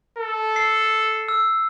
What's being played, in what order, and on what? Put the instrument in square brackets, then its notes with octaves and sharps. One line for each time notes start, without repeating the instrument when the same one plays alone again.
[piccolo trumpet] A4
[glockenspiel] C7
E6